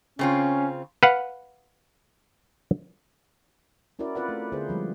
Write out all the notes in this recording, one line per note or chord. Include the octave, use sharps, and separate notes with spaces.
C#3 C4 C#4 F4
B4 F5 F#5
C#4 E4 F#4 A#4 D5
C4 F4 B4 D5 F#5
A3
D3 B3 G#4 C5
F3 G3 G#3